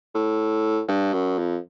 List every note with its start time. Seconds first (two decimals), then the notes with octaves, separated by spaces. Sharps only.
0.15 A2
0.88 G2
1.13 F#2
1.38 F2